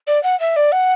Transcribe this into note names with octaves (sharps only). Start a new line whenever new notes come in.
D5
F#5
E5
D5
F#5